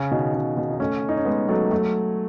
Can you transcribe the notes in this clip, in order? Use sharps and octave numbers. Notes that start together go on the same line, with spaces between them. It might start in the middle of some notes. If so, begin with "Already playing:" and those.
Already playing: C#3
B2 D#3
C#3
B2 D#3
D#4
A3 C#4
D#4
C#4
G#3 B3
F#3 A3
F#3 A3